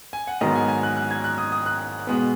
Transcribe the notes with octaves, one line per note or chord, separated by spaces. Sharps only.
G#5
F#5
G#2 D#3 F#3 B3 D#5
G#5
G#5
F#6
F#6
G#6
F#6
D#6
D#6
F#6
B2 G#3 B3